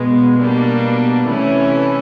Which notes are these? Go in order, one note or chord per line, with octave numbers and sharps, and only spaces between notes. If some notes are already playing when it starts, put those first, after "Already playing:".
Already playing: B2 G#3 B3
B2 G3 A#3 D4
C3 E3 A3 C#4 E4